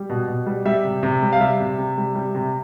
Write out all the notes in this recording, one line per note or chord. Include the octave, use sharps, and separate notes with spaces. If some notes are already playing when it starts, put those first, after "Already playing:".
Already playing: G3
B2
B2
G3
G3 E5
C3
C3
G3
F5
G3 E5
C3
C3
G3
G3
C3